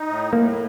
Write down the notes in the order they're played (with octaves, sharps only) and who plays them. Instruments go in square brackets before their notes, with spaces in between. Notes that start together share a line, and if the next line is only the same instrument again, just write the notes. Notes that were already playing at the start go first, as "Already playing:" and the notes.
Already playing: [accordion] D#4
A2
[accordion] A2 [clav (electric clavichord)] A#3